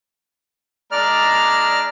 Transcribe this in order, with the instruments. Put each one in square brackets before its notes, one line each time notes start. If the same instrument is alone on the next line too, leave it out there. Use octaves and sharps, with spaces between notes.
[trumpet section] G#3 D4 A#5 [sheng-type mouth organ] D5 F6